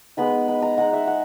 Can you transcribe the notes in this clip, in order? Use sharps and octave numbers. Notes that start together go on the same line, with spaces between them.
G#3 B3 D#4 B5
B5
A#5
G#3 D#4 F#5
E5
F#5